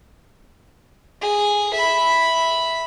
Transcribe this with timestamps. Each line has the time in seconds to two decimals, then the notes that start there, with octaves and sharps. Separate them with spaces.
1.21 G#4
1.74 E5 B5